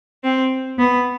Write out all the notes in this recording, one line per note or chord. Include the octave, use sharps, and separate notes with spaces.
C4
B3